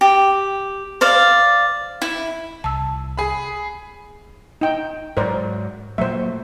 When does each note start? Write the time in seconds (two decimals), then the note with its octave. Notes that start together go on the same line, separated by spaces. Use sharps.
0.01 G4
1.01 C5 D5 F5
2.02 E4
2.64 C2 A5 E6
3.18 G#4 B5
4.61 D#4 G5
5.17 G#2 F#3 A#4 C5 D5
5.98 A#2 F#3 A3 C5 E5